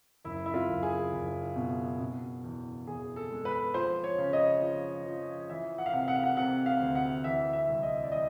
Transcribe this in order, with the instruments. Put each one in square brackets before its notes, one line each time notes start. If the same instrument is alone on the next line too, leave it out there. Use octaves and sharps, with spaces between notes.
[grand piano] F#1 E4
E4
F4
F#1
G#4
F#1
B2
B2
E2
E2 G#4
A4
G#3
B4
F3 C5
C#5
C#3
D#5
F3
F3
E3 E5
F#5
F5
C3 F#5
F#5
F5
F#5
C3 F#5
F5
D2
F#5
E3 E5
E5
C2
D#5
D5
E3 D#5